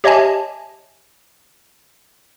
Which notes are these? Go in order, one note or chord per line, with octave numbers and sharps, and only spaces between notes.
G4 C#5 D#5 E5 G#5 A5